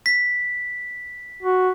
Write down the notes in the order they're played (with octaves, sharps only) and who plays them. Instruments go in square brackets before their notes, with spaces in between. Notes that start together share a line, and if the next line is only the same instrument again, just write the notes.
[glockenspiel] B6
[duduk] F#4